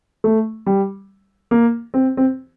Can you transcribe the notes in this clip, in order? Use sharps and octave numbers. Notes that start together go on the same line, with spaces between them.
A3
G3
A#3
C4
C4